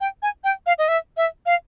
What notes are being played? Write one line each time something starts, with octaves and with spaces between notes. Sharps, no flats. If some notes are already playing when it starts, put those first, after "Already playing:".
G5
G#5
G5
F5
D#5
E5
E5
F5